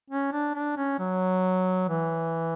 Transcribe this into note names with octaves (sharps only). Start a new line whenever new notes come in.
C#4
D4
D4
C#4
F#3
E3